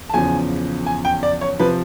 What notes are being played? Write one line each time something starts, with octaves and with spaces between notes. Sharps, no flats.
A5
E2 C#3 F3 G#5
G#5
G5
D5
C#5
C3 F3 B4